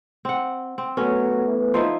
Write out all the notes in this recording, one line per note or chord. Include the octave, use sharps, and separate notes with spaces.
C4 F#5
C4
F#3 A3 B3 C#4
E3
F3 D#4 E4 C5